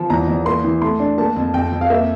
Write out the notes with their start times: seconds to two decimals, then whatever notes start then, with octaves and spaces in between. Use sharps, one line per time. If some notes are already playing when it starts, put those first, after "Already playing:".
Already playing: F3
0.10 E2 A#5
0.28 E2
0.46 A#3 C6
0.64 E3
0.82 A3 C6
1.00 D4
1.18 A#3 A5
1.36 F2
1.54 F2 G5
1.72 F2
1.81 F5
1.90 A#3 E5